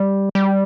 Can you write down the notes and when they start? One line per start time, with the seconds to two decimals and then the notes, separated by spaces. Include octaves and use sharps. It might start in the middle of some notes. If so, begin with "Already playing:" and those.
Already playing: G3
0.35 G3